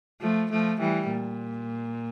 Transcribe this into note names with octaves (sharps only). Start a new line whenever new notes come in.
F3 A3
F3 A3
E3 G3
A#2